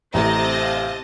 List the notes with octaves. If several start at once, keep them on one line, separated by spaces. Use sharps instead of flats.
A1 C3 A3 C4 D#5 A5 A#5
F5